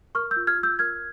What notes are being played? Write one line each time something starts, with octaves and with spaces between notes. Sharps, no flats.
A#4 C#6 F6
E6 G6
F4
F6 G#6
F4
E6 G6
A#4 F6 G#6